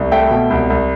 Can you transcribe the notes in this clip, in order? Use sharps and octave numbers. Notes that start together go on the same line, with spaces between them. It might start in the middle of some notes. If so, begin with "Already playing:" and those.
Already playing: C2
A3 E5 G5
B2
C2
C2